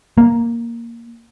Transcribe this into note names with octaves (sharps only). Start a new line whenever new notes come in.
A#3